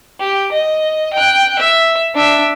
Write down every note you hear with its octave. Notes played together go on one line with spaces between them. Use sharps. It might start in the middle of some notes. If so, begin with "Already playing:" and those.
G4
D#5
G5 F#6
E5
D4 E5